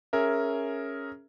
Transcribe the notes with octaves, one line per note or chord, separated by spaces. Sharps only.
C#4 G#4 A#4 E5